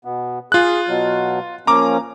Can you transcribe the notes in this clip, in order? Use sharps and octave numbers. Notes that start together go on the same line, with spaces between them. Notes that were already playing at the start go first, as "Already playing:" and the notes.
B2 B3
F4 G#4 F#6
B2 F#3
F3 A#3 C#4 A#5 D6